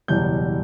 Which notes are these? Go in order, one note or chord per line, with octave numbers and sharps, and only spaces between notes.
F#1 E2 B2 G3 G6